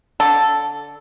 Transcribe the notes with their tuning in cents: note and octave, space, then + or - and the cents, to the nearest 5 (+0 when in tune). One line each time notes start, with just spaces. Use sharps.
D3 -20 A4 +0